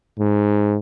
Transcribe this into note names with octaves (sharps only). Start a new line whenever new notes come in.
G#2